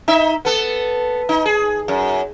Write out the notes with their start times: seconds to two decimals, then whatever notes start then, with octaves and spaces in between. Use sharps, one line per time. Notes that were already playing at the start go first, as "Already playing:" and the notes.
0.08 D#4 E5
0.45 B3 A4
1.29 D#4
1.45 G#4
1.88 F#2